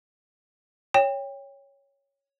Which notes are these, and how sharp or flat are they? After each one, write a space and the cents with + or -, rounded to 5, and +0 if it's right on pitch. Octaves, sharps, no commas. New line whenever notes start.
C#5 +0 G5 +25